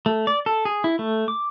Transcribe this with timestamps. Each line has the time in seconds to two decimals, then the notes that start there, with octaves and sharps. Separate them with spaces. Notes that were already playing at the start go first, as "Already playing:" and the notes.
0.06 A3
0.27 D5
0.46 A4
0.65 G#4
0.84 E4
0.99 A3
1.28 D6